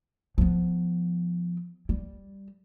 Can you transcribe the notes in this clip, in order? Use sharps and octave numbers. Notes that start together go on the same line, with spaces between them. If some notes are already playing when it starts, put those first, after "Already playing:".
F3 B3
G3